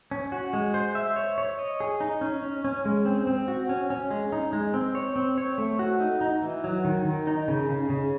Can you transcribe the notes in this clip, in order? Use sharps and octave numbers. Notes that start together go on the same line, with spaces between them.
C#4
F#4
G#3
C5
E5
C#5
C#5
D#5
G#4
D#4
C#4
C#4
C#4
G#3
C4
C4
F#4
C#4
C#4
G#3
D#4
G#3
C4
C#5
C4
C#5
A3
F#4
D#4
D#4
E3
F#3
D#3
D#3
D#4
C#3
C#3
C#3